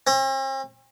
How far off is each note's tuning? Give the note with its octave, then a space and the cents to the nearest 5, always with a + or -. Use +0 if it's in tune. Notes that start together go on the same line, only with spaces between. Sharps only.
C4 +45